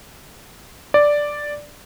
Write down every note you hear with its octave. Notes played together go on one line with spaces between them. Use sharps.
D5